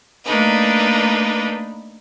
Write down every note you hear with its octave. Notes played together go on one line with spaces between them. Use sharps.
A3 A#3 D4 D#4 B4